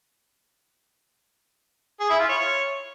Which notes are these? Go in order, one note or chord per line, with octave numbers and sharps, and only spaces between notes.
G#4
E4
F4
C#5